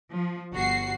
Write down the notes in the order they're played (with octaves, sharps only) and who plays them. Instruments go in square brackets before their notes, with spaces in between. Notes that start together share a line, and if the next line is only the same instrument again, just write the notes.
[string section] F3
G1 F#4 C7